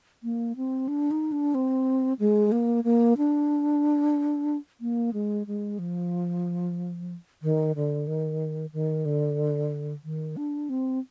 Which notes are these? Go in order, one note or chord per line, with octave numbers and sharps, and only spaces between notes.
A#3
C4
D4
D#4
D4
C4
G#3
A#3
A#3
D4
A#3
G#3
G#3
F3
D#3
D3
D#3
D#3
D3
D#3
D4
C4